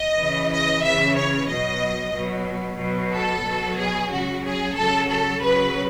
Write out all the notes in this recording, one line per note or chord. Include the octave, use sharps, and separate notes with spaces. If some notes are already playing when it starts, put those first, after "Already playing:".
Already playing: D#5
C#3 E3
D#5
C#3 E3 E5
C#5
B2 F#3 D#5
B2 F#3
B2 F#3
A4
B2 F#3
G#4
C#3 F#3 F#4
G#4
C#3 F#3 A4
A4
C#3 F#3 B4